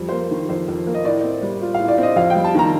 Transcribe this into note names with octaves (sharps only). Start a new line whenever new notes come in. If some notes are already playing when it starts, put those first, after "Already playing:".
Already playing: F2 G3
A#3 C5
D#3
F2 C5
F2
A#3
D#5
A2 D5
C4
G3
F4
A2 F5
D5
C4
D#5
F2 F5
G5
G3
A5
D#3 A#5